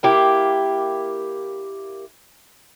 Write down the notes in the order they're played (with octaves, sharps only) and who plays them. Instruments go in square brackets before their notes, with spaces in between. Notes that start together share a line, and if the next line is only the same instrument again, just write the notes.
[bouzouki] A#3 E4 G4